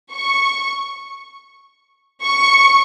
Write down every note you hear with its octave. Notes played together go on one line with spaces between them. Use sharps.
C#6
C#6